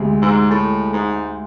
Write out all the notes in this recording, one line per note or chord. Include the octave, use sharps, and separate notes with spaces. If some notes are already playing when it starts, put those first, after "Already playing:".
Already playing: D2 C3 G#3
G#2
A2
G#2